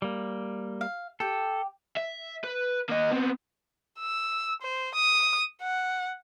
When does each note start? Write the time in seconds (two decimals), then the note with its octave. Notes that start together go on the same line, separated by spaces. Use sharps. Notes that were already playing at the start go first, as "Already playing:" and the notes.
0.02 G3 A#3
0.81 F5
1.20 G4 A4 G5
1.97 E5
2.44 B4
2.90 A#3 D#5
3.12 B3 C4
4.00 E6
4.62 C5
4.95 D#6
5.62 F#5